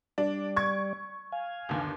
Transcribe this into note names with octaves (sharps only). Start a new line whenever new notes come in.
G3 D4 D5
C#6 G#6
F5 G#5
G1 D#2